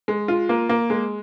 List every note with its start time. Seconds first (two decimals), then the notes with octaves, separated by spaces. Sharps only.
0.08 G#3
0.28 F4
0.49 A#3
0.69 A#3
0.90 G#3